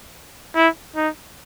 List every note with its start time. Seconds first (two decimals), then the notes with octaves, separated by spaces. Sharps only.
0.56 E4
0.96 D#4